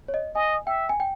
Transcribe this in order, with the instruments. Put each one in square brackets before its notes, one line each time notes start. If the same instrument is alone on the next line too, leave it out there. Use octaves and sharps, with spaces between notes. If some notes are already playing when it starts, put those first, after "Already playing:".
[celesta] C#5
D#5
[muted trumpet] D#5 [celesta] G#5
[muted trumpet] E5 [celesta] G5
[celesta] G#5
G5